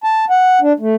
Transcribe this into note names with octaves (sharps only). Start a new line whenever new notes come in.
A5
F#5
D4
A3